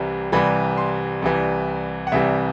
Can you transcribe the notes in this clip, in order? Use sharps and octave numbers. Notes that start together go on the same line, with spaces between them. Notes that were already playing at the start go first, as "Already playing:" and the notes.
Already playing: C2 C3 E3 G3
C2 C3 E3 G3 B5
C6
C2 C3 E3 G3
F#5
C2 C3 E3 G3 E5